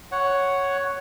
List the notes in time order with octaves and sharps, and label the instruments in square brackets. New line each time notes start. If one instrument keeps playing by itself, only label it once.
[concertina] C#5 F#5